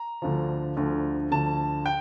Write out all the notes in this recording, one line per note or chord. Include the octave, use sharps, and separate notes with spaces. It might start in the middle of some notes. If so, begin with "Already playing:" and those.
Already playing: A#5
D2 D3 F3
D2 D3 F3
D2 D3 F3 A5
G5